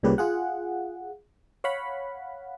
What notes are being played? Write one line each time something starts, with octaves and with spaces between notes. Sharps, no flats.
C2 A#2 C#3 G3 G4 B4
F4 G#4 F#5
C#5 F5 F#5 B5